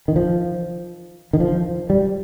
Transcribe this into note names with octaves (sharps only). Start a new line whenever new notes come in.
D#3
F3
D#3
F3
G3